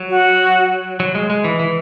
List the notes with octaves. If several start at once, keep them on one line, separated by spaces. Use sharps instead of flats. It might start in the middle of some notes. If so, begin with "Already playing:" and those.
Already playing: F#3
F#4
F#3
G#3
G#3
E3
E3